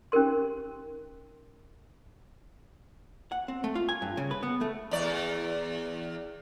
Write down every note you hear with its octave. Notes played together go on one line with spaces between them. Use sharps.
C#4 D#4 G4 A#4 C6
F#5
C4
A3
F4
G#5
G2
C#3
B4
B3
A3
E2 D5